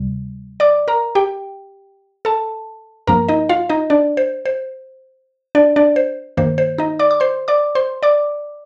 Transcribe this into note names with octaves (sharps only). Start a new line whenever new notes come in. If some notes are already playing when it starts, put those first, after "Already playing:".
Already playing: D2 C3 G3
D5 D6
A#4 A#5
G4 G5
A4 A5
G2 F3 A#3 A#4 A#5
D#4 D#5
F4 F5
D#4 D#5
D4 D5
C5
C5
D4 D5
D4 D5
C5
G2 D#3 A#3 C5
C5
D#4 D#5
D5 D6
D6
C5 C6
D5 D6
C5 C6
D5 D6